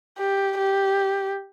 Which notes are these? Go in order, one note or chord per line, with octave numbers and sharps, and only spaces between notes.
G4
G4